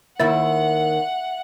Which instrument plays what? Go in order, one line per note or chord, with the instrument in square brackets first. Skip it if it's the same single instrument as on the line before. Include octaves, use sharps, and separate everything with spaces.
[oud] D#2 D#3 E4 [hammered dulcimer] E5 [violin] F#5 [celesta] A6